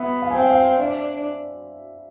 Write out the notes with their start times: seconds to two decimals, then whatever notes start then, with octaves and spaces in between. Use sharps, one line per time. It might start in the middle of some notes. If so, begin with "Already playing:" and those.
Already playing: B3 E5
0.22 F5
0.31 G#5
0.35 C4 F5
0.50 F5
0.79 D4 E5